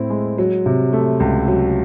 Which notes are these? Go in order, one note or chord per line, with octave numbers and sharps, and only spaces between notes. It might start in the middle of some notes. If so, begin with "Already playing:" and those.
Already playing: A2 C4 E4
G#3
F#3
C3
A3
C#2
F#3